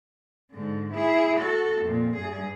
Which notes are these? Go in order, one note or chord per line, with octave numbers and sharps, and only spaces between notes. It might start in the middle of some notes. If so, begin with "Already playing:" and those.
G#2 D3
E4 G#4
F#4 A4
F2 A#2
G2 G#4